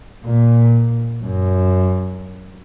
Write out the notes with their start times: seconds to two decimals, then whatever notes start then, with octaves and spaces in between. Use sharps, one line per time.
0.23 A#2
1.23 F#2